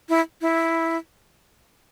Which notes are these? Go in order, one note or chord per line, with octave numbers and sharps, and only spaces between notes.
E4
E4